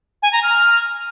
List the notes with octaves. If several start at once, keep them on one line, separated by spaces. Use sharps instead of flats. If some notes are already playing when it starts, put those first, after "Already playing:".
G#5
A#5
F6